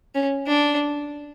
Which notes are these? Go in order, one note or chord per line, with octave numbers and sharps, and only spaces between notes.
C#4
D4